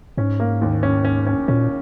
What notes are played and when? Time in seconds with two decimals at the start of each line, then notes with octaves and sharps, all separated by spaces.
0.17 G#2 C#4
0.40 A#3
0.62 D#2
0.83 C#4
1.05 C#4
1.26 C#4
1.48 A#2 C#4